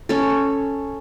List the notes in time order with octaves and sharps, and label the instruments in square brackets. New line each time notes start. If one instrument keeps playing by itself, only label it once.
[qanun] C#4 A4